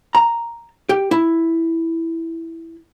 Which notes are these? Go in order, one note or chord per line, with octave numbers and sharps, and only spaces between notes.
A#5
G4
E4